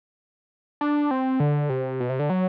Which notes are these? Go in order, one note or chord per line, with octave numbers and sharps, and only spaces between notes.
D4
C4
D3
C3
B2
C3
D3
F#3